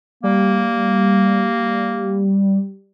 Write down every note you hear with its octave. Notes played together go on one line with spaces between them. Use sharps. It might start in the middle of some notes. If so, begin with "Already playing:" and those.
G3 A#3